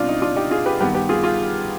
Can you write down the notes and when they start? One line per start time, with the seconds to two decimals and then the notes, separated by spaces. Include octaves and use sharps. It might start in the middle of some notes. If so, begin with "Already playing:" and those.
Already playing: B2 G3 C4 D4 F4
0.08 D#4
0.22 D4 F4
0.36 D#4 G4
0.51 F4 G#4
0.66 G4 B4
0.80 G2 D#3 B3 G4 B4
0.94 G4 B4
1.09 F4 G#4
1.24 F4 G#4